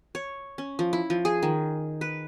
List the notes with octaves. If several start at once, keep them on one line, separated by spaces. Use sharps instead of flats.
C#5
C#4
F3
E4
F3
G#4
D#3
B4